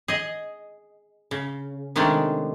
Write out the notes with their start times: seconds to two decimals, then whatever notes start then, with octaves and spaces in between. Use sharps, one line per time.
0.08 G#4 D#5
1.31 C#3
1.96 C3 D#3 G#3 A3 C#4 D4